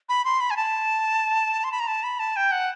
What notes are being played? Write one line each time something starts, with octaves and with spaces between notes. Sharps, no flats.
B5
C6
B5
G#5
A5
C6
B5
A#5
A5
B5
A5
G5
F#5